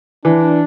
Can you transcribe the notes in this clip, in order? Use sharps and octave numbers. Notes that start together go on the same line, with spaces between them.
E3 D4